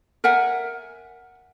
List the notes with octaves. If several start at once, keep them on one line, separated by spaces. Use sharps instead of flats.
A#4 E5 F#5 G#5